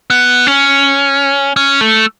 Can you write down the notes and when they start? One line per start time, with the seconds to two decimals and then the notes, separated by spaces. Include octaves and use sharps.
0.10 B3
0.47 C#4
1.56 C#4
1.81 A3